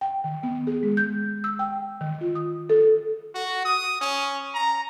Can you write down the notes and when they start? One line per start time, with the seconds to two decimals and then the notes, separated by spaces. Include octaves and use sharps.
0.01 G5
0.24 D#3
0.43 B3
0.67 G#4
0.83 G#3
0.97 G6
1.44 E6
1.59 G5
2.01 D#3
2.21 F4
2.35 D#6
2.70 A4
3.35 F#4
3.65 D#6
4.01 C#4
4.55 A#5